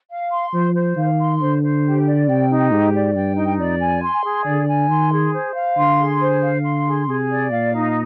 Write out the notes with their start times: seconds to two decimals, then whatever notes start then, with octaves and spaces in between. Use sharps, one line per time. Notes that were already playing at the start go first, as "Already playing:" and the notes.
0.11 F5
0.31 C6
0.53 F3 C5
0.75 C5
0.97 D#3 F5
1.19 C6
1.41 D3 C5
1.63 C5
1.84 G4
2.06 D5
2.29 C3 G5
2.50 D#4
2.72 G#2 G4
2.93 D5
3.15 G2 G5
3.37 D#4
3.59 F2 D5
3.81 G#5
4.02 C6
4.24 G#4
4.46 D3 D5
4.68 G#5
4.89 D#3 C6
5.12 G#4
5.33 C5
5.55 F5
5.77 D3 C6
5.99 G#4
6.21 C5
6.42 F5
6.64 C6
6.87 G#4
7.08 C3 G#4
7.30 D5
7.51 A#2 F5
7.74 D#4